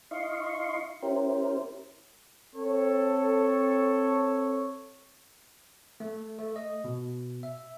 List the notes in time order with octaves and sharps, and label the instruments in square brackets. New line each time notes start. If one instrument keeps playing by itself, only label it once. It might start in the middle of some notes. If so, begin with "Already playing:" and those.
[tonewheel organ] D#4 E4 D#5 F5 C6 C#6
C#4 E4 G4 A#4 C5
[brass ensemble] C4 A4 C#5
[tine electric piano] A3
A3
D#5
B2
E5